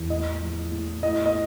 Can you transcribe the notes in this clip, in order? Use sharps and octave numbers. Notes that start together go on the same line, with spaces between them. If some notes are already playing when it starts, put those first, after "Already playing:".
Already playing: E2
A2 D#5
F3
A2
A2 D#5
D#5